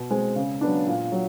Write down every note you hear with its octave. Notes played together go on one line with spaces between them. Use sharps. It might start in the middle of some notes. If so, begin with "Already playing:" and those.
Already playing: B2
G#3 C4
C#3
F#3 B3 D4
A#2
F#3